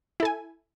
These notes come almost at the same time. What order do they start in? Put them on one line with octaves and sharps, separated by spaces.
E4 A4 G#5